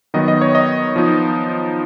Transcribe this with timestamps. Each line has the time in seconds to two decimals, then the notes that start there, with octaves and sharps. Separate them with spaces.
0.14 D#3 F#3 B3 D#5
0.28 D#5
0.41 C#5
0.55 D#5
0.96 F3 B3 D#4